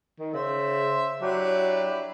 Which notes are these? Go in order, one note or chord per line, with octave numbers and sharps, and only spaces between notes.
D#3
C#3 C5 E5
F#3 D4 E4 G4